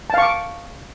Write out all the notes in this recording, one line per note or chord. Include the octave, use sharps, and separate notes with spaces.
F5 A5 C#6 D6